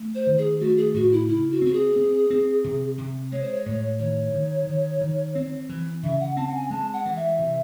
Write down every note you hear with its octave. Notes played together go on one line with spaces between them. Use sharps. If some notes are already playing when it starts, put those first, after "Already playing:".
Already playing: A3
C5
D#3
G#4
A3 F#4
G#4
A2 F#4
E4
C#3 E4
F#4
C4 F#4
G#4
C4
C4
C3
C3
G#3 C#5
C5
C#5
A2
D#3 C#5
D#3
D#3
D#3
C4
E3
C#3 E5
F#5
C4 A5
F#5
G#5
G#3 A5
F#5
E3
E5
C3